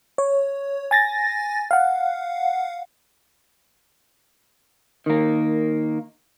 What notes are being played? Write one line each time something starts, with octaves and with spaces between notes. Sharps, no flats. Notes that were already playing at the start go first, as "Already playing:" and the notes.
C#5
G#5 A6 A#6
F5 F#5
D#3 A#3